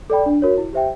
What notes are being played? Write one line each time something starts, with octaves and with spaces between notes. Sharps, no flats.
A4 D5 G5 B5
D4
F#4 A#4 C#5
E4
G4 C5 E5 G5